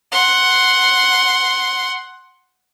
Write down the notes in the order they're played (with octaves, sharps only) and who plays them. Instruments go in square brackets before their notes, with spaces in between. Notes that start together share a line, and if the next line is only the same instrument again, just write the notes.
[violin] F#5 C6